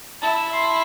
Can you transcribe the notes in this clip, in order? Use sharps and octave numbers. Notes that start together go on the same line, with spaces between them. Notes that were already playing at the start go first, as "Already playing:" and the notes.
E4 A5
C6